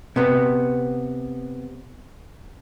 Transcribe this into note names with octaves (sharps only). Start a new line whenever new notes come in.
C3 B3